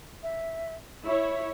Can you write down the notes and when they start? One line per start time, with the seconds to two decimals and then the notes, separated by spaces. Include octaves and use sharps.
0.23 E5
1.05 E4 C#5 E5